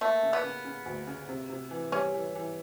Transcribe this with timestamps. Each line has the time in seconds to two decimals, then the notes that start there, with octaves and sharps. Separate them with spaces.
0.01 A3 A#3
0.23 C#3
0.33 B3
0.44 C#3
0.65 C#3
0.86 D2
1.07 C#3
1.29 C3
1.49 C3
1.71 E3
1.92 G3 C#4
2.14 E3
2.35 E3